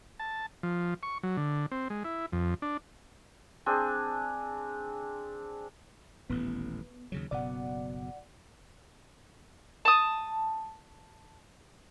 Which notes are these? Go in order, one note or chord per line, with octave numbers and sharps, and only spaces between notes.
A5
F3
C#6
F#3
D3
C4
G#3
E4
F2
D4
C4 D4 G#4
D#1 A1 A2 B3
D#2 C#3 F#3
F#1 B2 B3 D5 F#5
A5 D#6